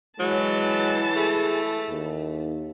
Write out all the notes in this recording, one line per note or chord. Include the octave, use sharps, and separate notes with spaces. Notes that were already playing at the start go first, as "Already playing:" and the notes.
E3 F#3 G#3 A5
A3 G#4
D#2